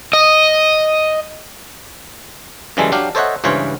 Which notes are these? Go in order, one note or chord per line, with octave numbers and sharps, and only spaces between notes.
D#5
F#2 C#3 E3 G3 G#3 A4
F#3 D4 G4 F5
A4 C5 C#5 D#5 E5 F#5
C#2 G2 E3 F4 C5 C#5